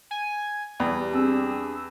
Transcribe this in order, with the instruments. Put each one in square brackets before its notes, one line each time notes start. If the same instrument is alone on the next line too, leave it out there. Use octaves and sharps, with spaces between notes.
[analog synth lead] G#5
[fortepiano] E2 [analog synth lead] G3
[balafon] C4 [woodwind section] D4 G#4 E6